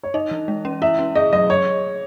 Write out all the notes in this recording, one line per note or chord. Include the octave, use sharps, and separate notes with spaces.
C#5
D#4 D#5
E3
G#3
C#4
E4 E5
C#4
G#4 D#5
F#3 D#5
G#4 C#5